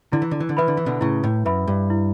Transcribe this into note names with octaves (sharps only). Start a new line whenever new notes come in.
D3 E4
E3
D3
E3
D3
E3 B4 E5 B5
D3
E3
B2 D3
A2 C#3 E4
A2
F#2 B4 E5 B5
G2
E4